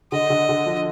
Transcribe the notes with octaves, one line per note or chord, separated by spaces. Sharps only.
D3 D#5
D3
D3
F3